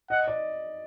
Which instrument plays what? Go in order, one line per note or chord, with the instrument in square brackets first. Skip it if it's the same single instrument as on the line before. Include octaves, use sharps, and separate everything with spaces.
[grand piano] D#5 [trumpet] F#5
[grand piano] D5